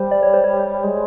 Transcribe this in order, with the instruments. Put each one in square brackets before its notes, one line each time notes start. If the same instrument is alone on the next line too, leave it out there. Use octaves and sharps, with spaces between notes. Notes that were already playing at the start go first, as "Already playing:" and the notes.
Already playing: [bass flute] G3 [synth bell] C5
[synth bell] D5
C#5
C5
C#5
[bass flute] G#3